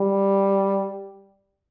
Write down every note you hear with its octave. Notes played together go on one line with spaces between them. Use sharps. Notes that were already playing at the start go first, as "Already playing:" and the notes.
Already playing: G3